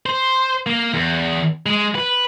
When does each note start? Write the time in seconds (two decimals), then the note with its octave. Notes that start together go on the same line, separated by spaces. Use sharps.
0.06 C5
0.66 A#3
0.94 E2
1.66 G#3
1.95 B4